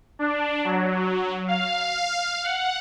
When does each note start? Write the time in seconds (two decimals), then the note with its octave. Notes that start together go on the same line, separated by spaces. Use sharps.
0.19 D4
0.64 F#3
1.48 F5
2.43 F#5